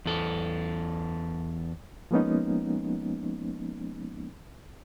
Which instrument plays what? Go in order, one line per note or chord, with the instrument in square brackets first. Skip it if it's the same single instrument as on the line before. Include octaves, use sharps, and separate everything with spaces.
[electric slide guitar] E2 A4
[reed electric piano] F3 G#3 A#3 B3 C#4 D#4